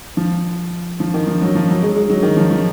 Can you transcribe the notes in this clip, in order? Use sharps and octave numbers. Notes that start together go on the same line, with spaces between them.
F3
F3
D#3
F3
F#3
F3
F#3
G#3
G#3
F#3
D#3
F3
F3